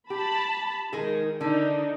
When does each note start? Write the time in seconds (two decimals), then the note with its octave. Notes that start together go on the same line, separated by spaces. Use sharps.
0.10 G4 A5 B5
0.93 D#3 G#3 G#4
1.41 D3 D4 D#4